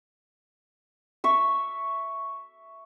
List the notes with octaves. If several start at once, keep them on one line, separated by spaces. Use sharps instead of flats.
E5 C#6